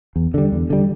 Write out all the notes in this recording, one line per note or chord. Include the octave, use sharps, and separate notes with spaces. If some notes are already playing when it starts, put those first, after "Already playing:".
E2
D3 G3
E2
D3 G3